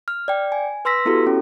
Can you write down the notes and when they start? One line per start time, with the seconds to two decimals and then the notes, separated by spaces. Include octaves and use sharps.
0.08 F6
0.28 D5 G5
0.52 G#5
0.85 B4 C6 E6 A#6 B6
1.05 B3 E4 F#4 G4 A4
1.27 C#4